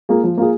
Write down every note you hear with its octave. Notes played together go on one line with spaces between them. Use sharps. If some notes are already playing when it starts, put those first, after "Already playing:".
A#3 F4 G#4
F3
A#3 F4 G#4